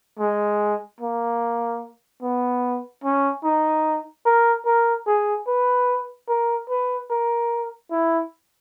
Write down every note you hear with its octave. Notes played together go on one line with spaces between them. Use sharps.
G#3
A#3
B3
C#4
D#4
A#4
A#4
G#4
B4
A#4
B4
A#4
E4